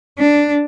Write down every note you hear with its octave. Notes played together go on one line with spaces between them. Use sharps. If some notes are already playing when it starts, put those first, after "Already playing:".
D4